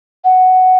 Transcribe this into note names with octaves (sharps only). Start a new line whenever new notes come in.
F#5